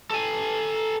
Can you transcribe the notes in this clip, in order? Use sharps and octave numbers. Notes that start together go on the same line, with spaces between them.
A4 G#5